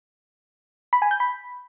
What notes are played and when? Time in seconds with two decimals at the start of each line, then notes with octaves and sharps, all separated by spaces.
0.93 B5
1.02 G#5
1.11 G6
1.20 B5